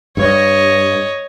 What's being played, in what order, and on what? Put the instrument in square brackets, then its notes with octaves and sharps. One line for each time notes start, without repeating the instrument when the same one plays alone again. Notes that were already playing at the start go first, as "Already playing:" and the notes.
[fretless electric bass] G2 [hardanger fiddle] C#5 D#5